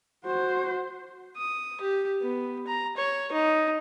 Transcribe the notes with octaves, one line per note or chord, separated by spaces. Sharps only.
F#4 C5
D#6
G4
B3
A#5
C#5
D#4